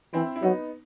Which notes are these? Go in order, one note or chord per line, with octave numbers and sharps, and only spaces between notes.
E3 C4 E4
E4
F#3 B3 D#4